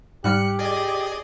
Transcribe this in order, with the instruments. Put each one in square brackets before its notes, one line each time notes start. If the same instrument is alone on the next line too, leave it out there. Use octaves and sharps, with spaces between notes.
[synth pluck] G#2 G3 F6 [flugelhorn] G4 [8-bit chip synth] F#6 C#7
[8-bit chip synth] G#4 D5 D#5